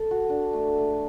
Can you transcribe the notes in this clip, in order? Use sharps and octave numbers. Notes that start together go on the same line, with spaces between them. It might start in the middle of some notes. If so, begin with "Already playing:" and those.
Already playing: A4
F#4
D4
A3
A3